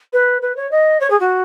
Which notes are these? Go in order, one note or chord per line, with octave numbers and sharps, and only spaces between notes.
B4
B4
C#5
D#5
C#5
G#4
F#4